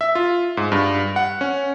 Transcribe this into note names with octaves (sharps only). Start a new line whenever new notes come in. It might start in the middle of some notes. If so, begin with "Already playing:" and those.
E5
F4
G#2
G2
F#5
C#4